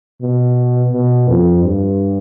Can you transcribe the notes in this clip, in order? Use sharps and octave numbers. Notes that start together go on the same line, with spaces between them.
B2
B2
F2
G2